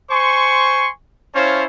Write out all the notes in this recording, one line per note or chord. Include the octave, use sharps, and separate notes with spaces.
C5 G#5 C6 C#6
C#4 E4 C5 C#5 F5 A5